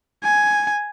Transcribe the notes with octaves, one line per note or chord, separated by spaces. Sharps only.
G#5